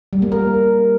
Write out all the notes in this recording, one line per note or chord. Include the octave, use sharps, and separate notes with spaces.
G3
A#3
A#4